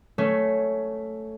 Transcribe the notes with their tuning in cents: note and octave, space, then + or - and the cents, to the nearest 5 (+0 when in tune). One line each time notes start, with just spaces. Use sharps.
A3 +0 C#4 +10